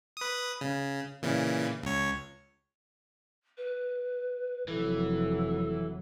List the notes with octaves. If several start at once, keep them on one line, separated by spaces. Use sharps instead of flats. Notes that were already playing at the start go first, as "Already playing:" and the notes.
B4 D#6
C#3
A#2 C#3 E3
C#2 C#5
B4
F1 E3 F#3 A4